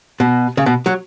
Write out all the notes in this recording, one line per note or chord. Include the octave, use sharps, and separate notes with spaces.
B2
C#3
B2
F#3